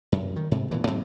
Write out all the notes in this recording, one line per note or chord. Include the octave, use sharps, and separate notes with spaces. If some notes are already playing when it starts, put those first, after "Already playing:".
F#2
D#3
G#2 C3
E1 A#2 E3
G#2 F#3 C4